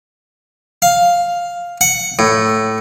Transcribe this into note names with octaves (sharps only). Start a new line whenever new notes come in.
F5
F#5
A2